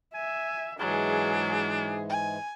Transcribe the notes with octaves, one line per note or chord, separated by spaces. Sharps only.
E5 G#5
G#2 E3 F#3 G#3 D4 G#4
G#5